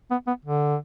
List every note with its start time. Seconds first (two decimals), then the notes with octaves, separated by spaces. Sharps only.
0.11 B3
0.27 B3
0.45 D3